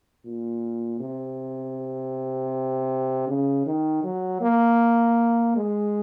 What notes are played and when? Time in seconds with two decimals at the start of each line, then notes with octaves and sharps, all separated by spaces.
0.25 A#2
1.00 C3
3.28 C#3
3.66 D#3
4.04 F#3
4.41 A#3
5.56 G#3